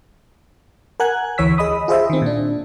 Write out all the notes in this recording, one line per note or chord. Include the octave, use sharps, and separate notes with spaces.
A#4 F#5 G#5 F#6 G#6
D2 E3 C#5 E6 B6
G#4 D#5 B5 D#6
F4 G#4 C5 D#5 E5
D#3 C4
A#2 D4